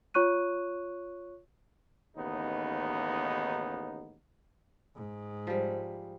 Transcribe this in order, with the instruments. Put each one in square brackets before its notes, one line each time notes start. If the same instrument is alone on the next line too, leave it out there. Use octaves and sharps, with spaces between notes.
[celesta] F4 C#5 C#6 F#6 D#7
[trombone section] A1 D#2 C#3 B3 D#4
[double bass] G#2
[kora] F3 G3